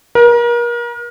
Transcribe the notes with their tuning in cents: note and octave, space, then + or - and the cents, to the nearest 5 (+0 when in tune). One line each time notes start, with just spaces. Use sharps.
A#4 +35